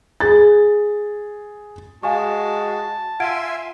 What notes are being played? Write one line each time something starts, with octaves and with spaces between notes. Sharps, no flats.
G#4 A6
G#3 F#4 F5 G#5 A5 C#6
F4 E5 F#5 G#5 C6 G#6 D7